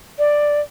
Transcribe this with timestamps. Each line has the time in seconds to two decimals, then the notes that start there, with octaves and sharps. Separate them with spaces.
0.19 D5